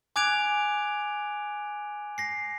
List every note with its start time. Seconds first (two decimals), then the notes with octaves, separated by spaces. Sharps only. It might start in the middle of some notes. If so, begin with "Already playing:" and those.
0.16 G#5 D6 F#6 G#6 D7 F7
2.18 A#6 C7